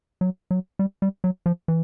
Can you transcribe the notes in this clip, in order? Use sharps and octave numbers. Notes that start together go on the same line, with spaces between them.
F#3
F#3
G3
G3
F#3
F3
E3